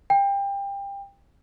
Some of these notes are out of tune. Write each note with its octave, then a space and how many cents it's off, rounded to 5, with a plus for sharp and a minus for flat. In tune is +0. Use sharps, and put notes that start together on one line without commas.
G5 +25